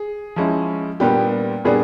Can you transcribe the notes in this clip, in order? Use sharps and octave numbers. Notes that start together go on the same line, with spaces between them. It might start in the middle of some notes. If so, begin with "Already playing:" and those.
Already playing: G#4
F3 G#3 C#4 E4
A#2 G3 B3 D4 G4
A#2 G3 B3 D4 G#4